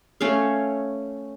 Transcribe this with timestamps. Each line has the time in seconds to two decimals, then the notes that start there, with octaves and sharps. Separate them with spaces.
0.21 A3 C#4 C#5 F5